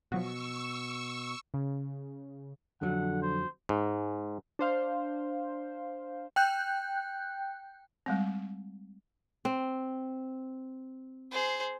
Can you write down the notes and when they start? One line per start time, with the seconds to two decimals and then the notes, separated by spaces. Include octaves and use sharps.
0.12 B2 F3 F#3 F#4 C#6 E6
1.54 C#3
2.81 F2 D3 F#3 F#5
3.22 C5
3.69 G#2
4.59 D4 C5 F5
6.36 G5 F#6 G6
8.06 G3 G#3 C4
9.45 C4
11.31 G#4 C5